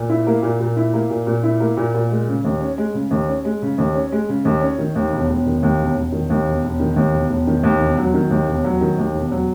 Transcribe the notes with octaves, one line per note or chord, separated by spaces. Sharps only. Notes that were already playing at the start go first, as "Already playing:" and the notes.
Already playing: A#2
E4
A#3
A#2
A#2
E4
A#3
A#2
A#2
E4
A#3
A#2
A#2
G#3
C#3
D#2
C#4
G#3
C#3
D#2
C#4
G#3
C#3
D#2
C#4
G#3
C#3
D#2
C#4
D#3
D#2
E1
E1
D#3
D#2
E1
E1
D#3
D#2
E1
E1
D#3
D#2
E1
E1
D#3
D#2
E1
F#3
D#3
D#2
E1
F#3
D#3
D#2
E1
F#3